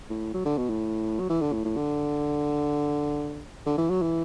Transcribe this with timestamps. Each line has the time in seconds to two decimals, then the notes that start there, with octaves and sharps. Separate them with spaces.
0.10 A2
0.34 F#3
0.45 D3
0.58 B2
0.69 A2
1.20 F#3
1.29 E3
1.41 D3
1.53 A2
1.65 A2
1.76 D3
3.66 D3
3.78 E3
3.90 F#3
4.02 E3